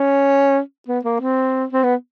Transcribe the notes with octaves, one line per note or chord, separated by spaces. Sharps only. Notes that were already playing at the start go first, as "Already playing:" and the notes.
Already playing: C#4
B3
A#3
C4
C4
B3